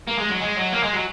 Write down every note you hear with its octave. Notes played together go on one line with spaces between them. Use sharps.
A#3
G#3
F#3
G#3
F#3
A#3
G#3
F#3